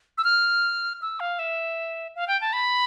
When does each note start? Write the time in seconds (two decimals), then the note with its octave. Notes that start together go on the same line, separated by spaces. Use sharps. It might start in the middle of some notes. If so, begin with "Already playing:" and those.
0.18 E6
0.24 F6
1.02 E6
1.20 F5
1.39 E5
2.16 F5
2.28 G5
2.41 A5
2.53 B5